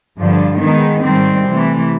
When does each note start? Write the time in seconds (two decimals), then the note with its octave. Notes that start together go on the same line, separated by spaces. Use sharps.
0.19 G2 D3 F3
0.61 D#3 G#3 B3 D#4
1.04 G#2 D#3 G3 C4
1.47 C3 E3 A3